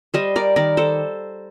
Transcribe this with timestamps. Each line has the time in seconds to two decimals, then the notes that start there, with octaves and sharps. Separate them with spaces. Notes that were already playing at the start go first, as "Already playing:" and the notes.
0.14 G3 C5 D#5
0.36 A#4 D5
0.56 D#3 A#4 D5
0.77 A4 C5